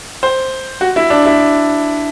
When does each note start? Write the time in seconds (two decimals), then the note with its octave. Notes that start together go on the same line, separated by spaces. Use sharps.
0.23 C5
0.81 F#4
0.96 E4
1.10 D4
1.26 E4